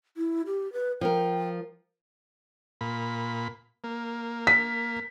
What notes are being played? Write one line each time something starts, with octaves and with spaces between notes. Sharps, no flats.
E4
G4
B4
F3 A#4 G5
A#2 B5
A#3
B6